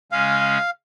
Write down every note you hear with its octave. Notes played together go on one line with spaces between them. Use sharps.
C#3 G#3 C#4 F5